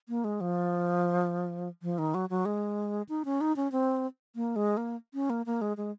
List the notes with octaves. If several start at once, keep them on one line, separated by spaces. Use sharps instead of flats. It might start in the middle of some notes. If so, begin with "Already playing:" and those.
A#3
G#3
F3
F3
D#3
F#3
F#3
G#3
D#4
C#4
D#4
C#4
C4
A#3
G#3
A#3
C#4
A#3
A#3
G#3
G#3